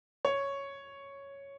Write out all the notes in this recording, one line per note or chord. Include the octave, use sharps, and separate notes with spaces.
C#5